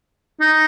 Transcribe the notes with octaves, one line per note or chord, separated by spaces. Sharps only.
D#4